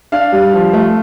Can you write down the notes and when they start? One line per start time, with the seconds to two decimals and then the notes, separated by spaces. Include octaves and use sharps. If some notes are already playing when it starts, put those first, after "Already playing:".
0.12 D4 F5
0.32 G3
0.54 F3
0.73 A3